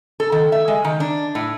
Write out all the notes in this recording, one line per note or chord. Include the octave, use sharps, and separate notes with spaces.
A4
D#3
E5
G#3
D#3
D4
A2